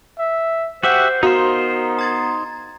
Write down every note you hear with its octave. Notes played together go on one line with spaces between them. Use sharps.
E5
F#4 G4 C5 E5 F#5
B3 D#4 F#4 A#4 C5 F5 C6
A#5 G#6 A6